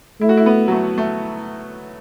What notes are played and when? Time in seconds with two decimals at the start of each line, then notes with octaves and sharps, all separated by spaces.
0.21 A3 E4
0.29 F#4
0.37 E4
0.46 B3
0.68 F#3
0.72 A3
0.98 A3